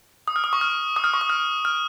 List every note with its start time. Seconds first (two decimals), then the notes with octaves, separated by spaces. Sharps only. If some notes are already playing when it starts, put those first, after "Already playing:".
0.28 D#6
0.36 F6
0.44 D#6
0.53 C#6
0.61 F6
0.96 D#6
1.04 F6
1.14 C#6
1.21 D#6
1.30 F6
1.65 F6